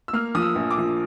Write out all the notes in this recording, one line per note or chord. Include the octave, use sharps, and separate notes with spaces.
E6
A#3 F6
F3 D#6
E6
A#1
D6
F3